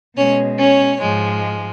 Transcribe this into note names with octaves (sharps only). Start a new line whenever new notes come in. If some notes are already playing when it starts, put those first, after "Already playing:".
B2 G#3 C#4 C#5
C#4 C#5
G#2 F3 G#3